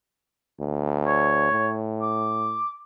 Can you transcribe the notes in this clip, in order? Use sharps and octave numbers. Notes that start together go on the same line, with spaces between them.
D2
C#5
A2
D6